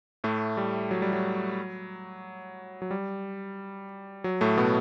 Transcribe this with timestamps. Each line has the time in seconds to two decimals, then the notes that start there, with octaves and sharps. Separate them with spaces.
0.24 A2 A3
0.57 G3
0.91 F#3
1.02 G3
1.13 F#3
2.82 F#3
2.91 G3
4.24 F#3
4.41 A2 A3
4.57 B2 B3